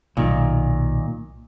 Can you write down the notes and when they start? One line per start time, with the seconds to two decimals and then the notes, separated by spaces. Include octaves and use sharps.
0.17 B1 A#2 D#3